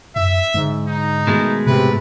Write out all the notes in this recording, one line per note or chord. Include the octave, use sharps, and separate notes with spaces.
F#2 E5
G#2 D3
D#4
B2 D#3 G#3 A3
G#2 C3 B4